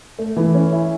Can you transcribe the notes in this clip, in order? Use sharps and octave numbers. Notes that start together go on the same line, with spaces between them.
A3
E3
C#4
E4